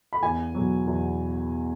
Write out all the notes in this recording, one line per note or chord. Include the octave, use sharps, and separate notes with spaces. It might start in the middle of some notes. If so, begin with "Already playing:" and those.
B5
E2 G#5
B2 F#3
E2